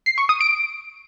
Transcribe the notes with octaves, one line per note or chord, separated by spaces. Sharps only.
C7
C#6
D#6
D7